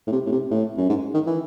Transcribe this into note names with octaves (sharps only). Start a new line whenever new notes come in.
A2
C3
A2
C3
A2
F#2
G#2
D#3
E3